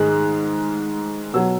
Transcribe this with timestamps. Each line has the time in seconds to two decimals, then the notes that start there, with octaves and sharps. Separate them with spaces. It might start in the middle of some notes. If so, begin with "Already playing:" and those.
Already playing: G#2 D#3 G#3 F#6
1.33 B2 F#3 E6